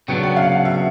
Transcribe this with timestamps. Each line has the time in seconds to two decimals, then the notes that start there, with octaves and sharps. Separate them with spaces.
0.08 C#3 F#3 B3 D4 G5
0.23 F#5
0.36 F5
0.52 F5
0.65 E5